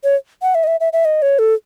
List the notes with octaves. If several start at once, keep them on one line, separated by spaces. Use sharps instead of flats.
C#5
F#5
E5
D#5
E5
E5
E5
D#5
C#5
A4